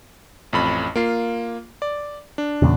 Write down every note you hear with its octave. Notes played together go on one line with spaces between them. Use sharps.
A1 F2 B5
A#3 F4 C7
D5
D4
E2 A#2 C#3